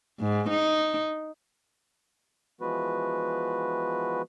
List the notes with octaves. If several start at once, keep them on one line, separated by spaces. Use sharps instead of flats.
G#2
D#4
E3 F3 G#3 B3 F#4 B4